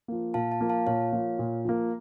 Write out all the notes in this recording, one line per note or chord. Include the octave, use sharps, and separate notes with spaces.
F3 A#3
A#2 F5 A5
F5 A5
F3 A#3
F5 A5
A#2 C#5 F5
F3 A#3
A#2
F3 A#3